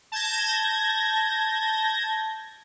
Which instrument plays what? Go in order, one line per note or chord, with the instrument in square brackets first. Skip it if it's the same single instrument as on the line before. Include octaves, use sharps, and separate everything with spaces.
[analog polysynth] A5 G6 G#6 A#6